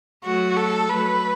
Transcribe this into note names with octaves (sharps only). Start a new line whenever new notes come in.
F#3 A3 F#4
A4
F#3 A3 B4